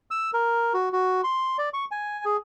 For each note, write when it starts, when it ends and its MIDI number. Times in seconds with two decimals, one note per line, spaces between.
0.11 0.31 88
0.33 0.73 70
0.74 0.89 66
0.93 1.21 66
1.24 1.57 84
1.58 1.69 74
1.74 1.85 85
1.91 2.25 80
2.25 2.37 68